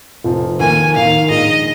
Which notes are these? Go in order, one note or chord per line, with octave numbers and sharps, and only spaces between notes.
F1 F2 F3
D#2 D#3 A#3 G#5
D#2 D#3 A#3 D#4 A#4 F5
A#1 G#2 D#3 A#3 G#4 D#5